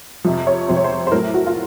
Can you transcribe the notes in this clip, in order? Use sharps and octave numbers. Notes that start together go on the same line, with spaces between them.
F2 C3 F3
C#5
F2 C3 F3 C5
C#5
C5
C5
A2 F#3 A3 A#4
F#4
F4